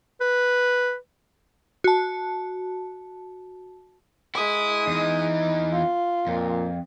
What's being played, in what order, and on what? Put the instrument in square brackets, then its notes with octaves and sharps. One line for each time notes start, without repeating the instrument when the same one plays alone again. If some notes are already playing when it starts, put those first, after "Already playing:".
[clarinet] B4
[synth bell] F#4 A5
[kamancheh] G#3 D#6 [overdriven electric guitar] E4
[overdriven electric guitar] E2 E3 [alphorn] D#4
[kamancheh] F4
[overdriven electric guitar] F2 [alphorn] A#2